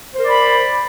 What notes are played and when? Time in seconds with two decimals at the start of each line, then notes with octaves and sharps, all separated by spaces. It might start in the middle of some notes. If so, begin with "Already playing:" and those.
0.14 C5
0.18 A#4
0.23 D5
0.28 B5